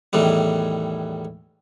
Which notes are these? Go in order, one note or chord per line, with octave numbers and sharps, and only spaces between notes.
E2 A2 D#3 E3 G3